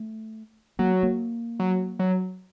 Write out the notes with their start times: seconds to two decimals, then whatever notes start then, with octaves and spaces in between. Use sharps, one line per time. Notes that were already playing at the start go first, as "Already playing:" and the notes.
Already playing: A3
0.79 F#3 A#3
1.03 A#3
1.60 F#3
1.99 F#3